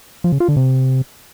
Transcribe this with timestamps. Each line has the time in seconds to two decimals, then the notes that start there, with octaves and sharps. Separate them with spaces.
0.24 F3
0.32 C#3
0.40 F4
0.48 D3
0.57 C3